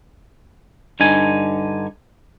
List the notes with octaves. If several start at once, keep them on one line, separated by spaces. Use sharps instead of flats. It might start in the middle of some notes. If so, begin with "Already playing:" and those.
G2 D3 D#4 G#5